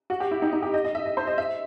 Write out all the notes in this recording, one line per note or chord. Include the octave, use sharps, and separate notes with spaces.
F#4
G4
E4
D#4
D#4
G4
D#5
D#5
E5
D#5
C5
D#5
E5